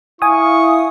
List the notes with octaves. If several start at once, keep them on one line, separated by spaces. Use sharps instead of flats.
E4 F5 G#5 C#6 D#6